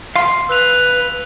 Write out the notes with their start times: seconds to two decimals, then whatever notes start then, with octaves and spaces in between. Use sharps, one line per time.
0.16 F5 C6
0.49 B4 E6 F#6 F7